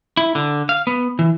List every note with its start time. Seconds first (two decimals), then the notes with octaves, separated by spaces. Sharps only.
0.17 E4
0.35 D3
0.69 F5
0.87 B3
1.19 E3